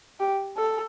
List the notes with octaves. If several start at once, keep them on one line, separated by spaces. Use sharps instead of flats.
G4
A4